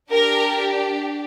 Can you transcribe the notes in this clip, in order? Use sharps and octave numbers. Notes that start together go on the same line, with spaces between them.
D4 G4 A#4